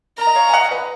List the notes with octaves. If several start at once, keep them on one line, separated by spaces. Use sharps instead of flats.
A#4 A#5
D#5
C#5 F5
G#5
D#5 F#5
B4 D#5